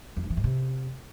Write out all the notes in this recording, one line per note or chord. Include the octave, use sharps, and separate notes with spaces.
F2
G2
E3
G#2
C3